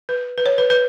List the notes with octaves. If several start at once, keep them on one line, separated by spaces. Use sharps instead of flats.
B4
B4
C#5
B4
B4